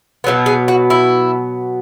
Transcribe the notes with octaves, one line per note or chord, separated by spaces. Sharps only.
B2 F#3 B3
G#4
F#4
E4